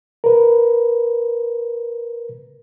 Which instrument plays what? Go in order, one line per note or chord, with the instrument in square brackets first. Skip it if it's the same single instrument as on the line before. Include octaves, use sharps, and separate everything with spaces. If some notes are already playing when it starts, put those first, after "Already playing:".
[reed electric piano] A#4 B4